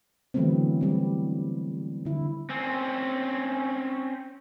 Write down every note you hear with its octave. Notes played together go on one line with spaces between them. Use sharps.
D3 E3 F#3 A3 B3 C4
G3 C4
D3 E4
C4 C#4